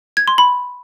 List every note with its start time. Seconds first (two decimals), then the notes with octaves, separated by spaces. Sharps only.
0.17 G#6
0.28 C6
0.38 B5